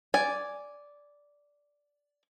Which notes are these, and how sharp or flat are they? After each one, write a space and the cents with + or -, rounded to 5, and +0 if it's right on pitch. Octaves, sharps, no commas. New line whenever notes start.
D5 -10 G#5 +0